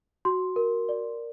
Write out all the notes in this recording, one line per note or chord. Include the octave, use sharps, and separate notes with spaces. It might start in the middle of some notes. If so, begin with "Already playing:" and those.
F#4 C6
A#4
D5